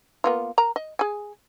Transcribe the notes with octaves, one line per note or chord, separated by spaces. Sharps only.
A#3 B3 F4
A#4 A#5
D#5
G#4 G#5